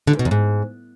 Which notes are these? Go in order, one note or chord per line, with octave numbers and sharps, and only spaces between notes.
D3
G#2
B2
E2
G#2